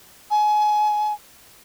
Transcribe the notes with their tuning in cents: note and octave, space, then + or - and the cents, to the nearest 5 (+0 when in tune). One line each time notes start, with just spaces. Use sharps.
G#5 +25